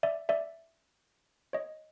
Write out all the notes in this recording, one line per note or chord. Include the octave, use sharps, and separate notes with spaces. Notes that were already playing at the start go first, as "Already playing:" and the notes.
D5 E5
D5 E5
C#5 D#5